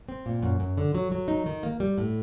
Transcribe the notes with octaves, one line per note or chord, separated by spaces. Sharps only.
C4
A#2
F#2
F#2
D3
F#3
F#3
D#4
D#3
A#3
G3
A2